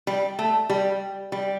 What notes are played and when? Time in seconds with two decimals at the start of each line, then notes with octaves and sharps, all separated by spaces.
0.07 G3
0.39 A3
0.70 G3
1.32 G3